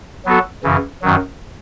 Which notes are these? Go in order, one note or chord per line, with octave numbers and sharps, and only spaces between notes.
F#3 B3 F#4 A4
F#2 C#3 E3
F#2 D#3 F#3